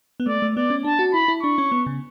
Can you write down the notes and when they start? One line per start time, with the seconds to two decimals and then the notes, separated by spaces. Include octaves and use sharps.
0.20 B3
0.26 A3 D5
0.42 A3
0.56 B3 D5
0.70 C#4
0.84 D4 A5
0.99 F#4
1.14 E4 B5
1.28 E4
1.42 D4 C#6
1.58 C#4
1.72 B3
1.86 C#3